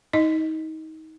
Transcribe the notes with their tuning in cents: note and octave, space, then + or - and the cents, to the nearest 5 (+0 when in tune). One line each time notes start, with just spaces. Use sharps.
D#4 +25 D#5 +0